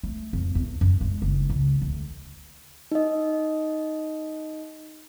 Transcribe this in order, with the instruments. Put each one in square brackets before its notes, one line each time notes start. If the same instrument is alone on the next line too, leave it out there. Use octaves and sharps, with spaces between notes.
[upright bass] A3
F2
E2
F#2
G#3
F#1
C#2
D2
[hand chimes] D#4 D#5